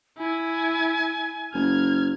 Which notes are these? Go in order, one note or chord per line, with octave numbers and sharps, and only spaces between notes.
E4 G#5
F#1 F6 G#6